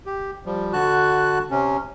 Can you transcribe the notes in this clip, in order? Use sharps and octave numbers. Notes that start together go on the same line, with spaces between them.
G4
F3 G3
D3 F#4 A5 F#6
C3 C#4